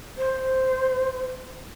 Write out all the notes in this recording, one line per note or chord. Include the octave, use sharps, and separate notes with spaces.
C5